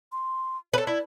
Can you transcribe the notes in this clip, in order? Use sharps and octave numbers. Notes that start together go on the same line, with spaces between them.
C6
A4 B4 C#5
E4 D5